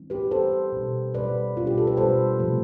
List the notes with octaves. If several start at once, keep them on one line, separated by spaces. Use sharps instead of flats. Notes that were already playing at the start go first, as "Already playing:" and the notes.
Already playing: E3 G3 C4
G4 B4
E3 G3 C4 A4 C5
B2 G3 D4
B2 G3 D4 B4 D5
B2 G3 D4 F4
G4
A4
B4
B2 G3 D4 A4 C5
C3 F3 A3